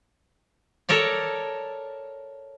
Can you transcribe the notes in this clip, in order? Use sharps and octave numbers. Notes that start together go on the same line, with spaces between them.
A4 A#4 C#5 D5